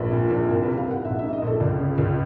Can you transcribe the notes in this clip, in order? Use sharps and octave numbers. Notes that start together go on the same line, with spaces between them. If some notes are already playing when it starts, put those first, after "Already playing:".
Already playing: A#1 B4
A#2
A#1
C2 A#4
C3 B4
F5
C2 F#5
A#1 E5
G#2 E5
D#5
A#1 A4
C#2 D5
C#3
C#2